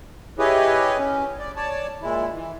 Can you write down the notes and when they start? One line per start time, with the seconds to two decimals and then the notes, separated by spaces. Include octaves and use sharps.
0.39 E4 G4 G#4 B4 C#5 D#5
0.98 C#4
1.39 D5
1.56 C#5 D5 A5
2.02 A#2 G#3 E4
2.33 E3